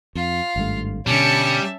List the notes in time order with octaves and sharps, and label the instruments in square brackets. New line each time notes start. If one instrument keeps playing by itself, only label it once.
[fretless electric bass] F2 [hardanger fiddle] F4 F5
[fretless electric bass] G#1 G2 A3
[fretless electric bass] B2 D3 [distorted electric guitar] G3 [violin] C#4 C#7 [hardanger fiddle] E5 A5